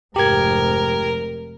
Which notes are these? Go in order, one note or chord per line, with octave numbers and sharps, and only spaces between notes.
F1 G#2 G4 A#4 G#6